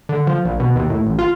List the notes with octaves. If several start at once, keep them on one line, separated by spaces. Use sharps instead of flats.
D3
F3
A#1
B2
D#2
A2
A1
F4